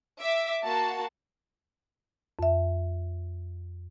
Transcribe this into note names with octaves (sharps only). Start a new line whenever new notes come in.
E5 D6
A#3 F#4 A5
F2 E5